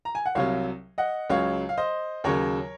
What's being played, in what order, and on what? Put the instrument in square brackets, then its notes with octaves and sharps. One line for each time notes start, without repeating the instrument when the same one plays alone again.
[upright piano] A#5
G#5
F#5
C2 C3 F#3 C#5 F5
D#5 F#5
C#2 C#3 F#3 C#5 F5
F5
C5 D#5
D#2 C#3 F#3 A#4 C#5